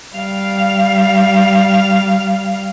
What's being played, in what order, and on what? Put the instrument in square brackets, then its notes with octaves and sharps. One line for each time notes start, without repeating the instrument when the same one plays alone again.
[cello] G3 F5